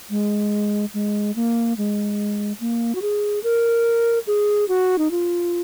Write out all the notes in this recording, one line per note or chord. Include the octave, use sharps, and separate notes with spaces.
G#3
G#3
A#3
G#3
A#3
F#4
G#4
A#4
G#4
F#4
D#4
F4